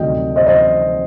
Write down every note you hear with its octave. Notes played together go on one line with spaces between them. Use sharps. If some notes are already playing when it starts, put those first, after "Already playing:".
Already playing: D2 C3 D#3 F#3 D#5 G5
C5 D#5
C5 D#5